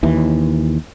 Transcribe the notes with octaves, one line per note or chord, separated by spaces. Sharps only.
D#2 E3